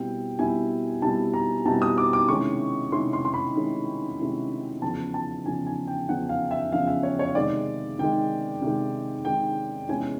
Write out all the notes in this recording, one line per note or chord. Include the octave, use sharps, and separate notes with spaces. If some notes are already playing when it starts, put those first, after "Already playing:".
Already playing: B2 G3 C4 E4 G5
B2 G3 C4 E4 G#5
B2 G3 C4 E4 A5
A#5
B2 G3 C4 E4 A5
D#6
D6
D6
C3 D#3 G#3 C#4 E4 C#6
C3 D#3 G#3 C#4 E4 C6
C6
C6
B5
C3 D#3 G#3 C#4 E4
C3 D#3 G#3 C#4 E4
E2 C#3 F3 A5
A5
E2 C#3 F3 G#5
G#5
G5
E2 C#3 F3 F#5
F5
E5
E2 C#3 F3 F5
E5
C#5
C#5
C3 D#3 G#3 D5
C3 D#3 G#3 G5
C3 D#3 G#3
C3 D#3 G#3 G5
E2 C3 E3 G#3 C#4 G#5